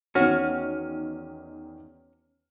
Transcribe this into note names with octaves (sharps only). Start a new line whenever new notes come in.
E2 D#3 C#4 F#4 F6